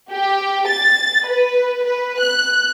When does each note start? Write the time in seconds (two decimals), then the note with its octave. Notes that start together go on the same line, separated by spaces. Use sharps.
0.11 G4
0.67 A6
1.27 B4
1.84 B4
2.19 F#6